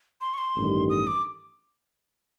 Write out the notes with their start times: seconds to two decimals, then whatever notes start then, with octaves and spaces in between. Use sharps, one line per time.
0.21 C6
0.34 C#6
0.38 C6
0.56 A1 G2 D#3 G3
0.89 D#6
1.07 D6